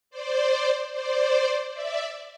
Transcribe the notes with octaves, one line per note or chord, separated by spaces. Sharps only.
C5 D5
C5 D5
D5 E5